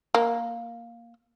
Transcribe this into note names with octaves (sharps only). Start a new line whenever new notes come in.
A#3